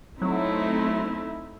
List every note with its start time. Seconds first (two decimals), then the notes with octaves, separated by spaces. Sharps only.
0.22 F#3 A3 C4 D#4 E4